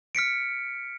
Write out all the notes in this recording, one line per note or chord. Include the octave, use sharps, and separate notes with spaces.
F6 B6 C#7 D7